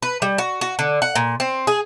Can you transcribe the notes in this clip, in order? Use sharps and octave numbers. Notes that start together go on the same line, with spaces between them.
B4
G3
F#4
F#4
D3
F#5
A#2
C4
G#4